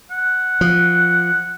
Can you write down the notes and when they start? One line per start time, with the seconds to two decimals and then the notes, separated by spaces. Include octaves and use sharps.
0.10 F#5
0.61 F3